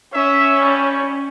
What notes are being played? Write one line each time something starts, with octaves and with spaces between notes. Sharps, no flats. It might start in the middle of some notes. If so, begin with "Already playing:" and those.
C#4 E5
G3